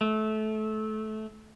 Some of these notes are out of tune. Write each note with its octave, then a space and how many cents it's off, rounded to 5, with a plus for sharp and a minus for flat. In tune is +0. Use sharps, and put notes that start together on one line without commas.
A3 -20